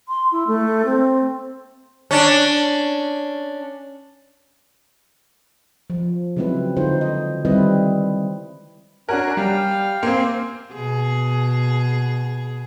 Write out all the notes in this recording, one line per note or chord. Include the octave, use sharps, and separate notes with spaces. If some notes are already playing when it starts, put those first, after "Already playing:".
C6
E4
A3
C4
C#4 D4
F3
C#3 F#3 G#3 C4 E4 B4
D3 D#4 F4 C5
D#5
D#3 G3 C4 E4 B4 D#5
C#4 D4 F#4 A#4 G#5 F#6
G3 F5 G5 F6
A#3 C4 C5 G#5 C6
B2 G#4